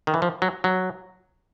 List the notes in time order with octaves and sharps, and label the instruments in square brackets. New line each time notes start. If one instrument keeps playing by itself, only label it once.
[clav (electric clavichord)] D#3
E3
F3
F#3
F#3